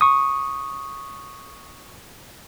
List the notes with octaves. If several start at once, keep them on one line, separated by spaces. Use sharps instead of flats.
C#6 D#6